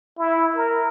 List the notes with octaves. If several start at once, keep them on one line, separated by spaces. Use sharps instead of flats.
E4
A#4